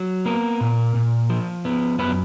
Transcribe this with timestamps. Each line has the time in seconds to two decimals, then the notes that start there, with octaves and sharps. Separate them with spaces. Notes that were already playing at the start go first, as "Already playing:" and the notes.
Already playing: F#3
0.26 A#3 B3 A#4
0.61 A#2
0.95 A#2
1.30 F3
1.65 B3
1.99 F#2 B3 B4